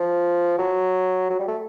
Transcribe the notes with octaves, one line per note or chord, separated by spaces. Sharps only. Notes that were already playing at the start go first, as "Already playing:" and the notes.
Already playing: F3
F#3
F#3
G3
A3